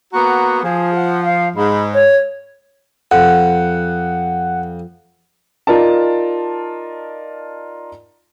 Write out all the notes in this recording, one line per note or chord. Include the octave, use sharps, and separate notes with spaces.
A#3 B3 F#4 A#5
F3 G#4
F#5
F5
G#2 B5
C#5
F2 F#5
D#4 F4 A#4 D5 A5